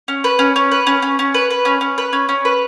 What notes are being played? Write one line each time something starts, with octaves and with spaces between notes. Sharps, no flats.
C#4
B4
C#4
C#4
B4
C#4
C#4
C#4
B4
B4
C#4
C#4
B4
C#4
C#4
B4